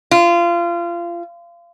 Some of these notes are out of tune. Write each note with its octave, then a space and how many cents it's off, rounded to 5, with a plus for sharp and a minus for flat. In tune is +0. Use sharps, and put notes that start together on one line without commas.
F4 -25